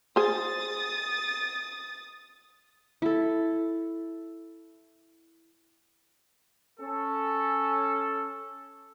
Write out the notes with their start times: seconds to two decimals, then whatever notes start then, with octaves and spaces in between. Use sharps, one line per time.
0.16 G#4 C5 D#6 A6
3.02 E4 A4
6.80 C#4 A4